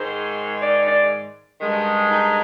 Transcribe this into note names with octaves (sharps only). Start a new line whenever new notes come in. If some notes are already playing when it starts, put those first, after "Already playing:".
Already playing: G#2 D#3 G#3 C5
D5
D5
G2 D#3 G#3
D#4